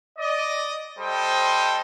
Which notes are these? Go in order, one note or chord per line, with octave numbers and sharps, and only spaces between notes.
D5 D#5
G3 A4 C5 D#5 G5